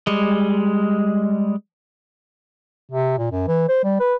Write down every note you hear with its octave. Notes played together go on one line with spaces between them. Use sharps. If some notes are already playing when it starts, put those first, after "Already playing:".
G3 G#3
C3
A#2
F#2
E3
C5
G3
B4